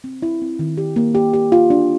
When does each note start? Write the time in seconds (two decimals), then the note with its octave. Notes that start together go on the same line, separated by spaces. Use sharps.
0.04 C4
0.22 E4
0.42 C4
0.59 D#3
0.78 G4
0.96 A#3
1.15 G4
1.34 G4
1.52 F4
1.70 D4